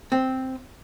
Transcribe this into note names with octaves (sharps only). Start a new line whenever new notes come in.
C4